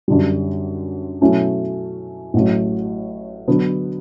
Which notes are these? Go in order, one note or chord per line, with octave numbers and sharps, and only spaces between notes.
F#2 D3 G3
B2 F#3 A3 C#4 E4
A1 A2 F#3
D3 F#3 B3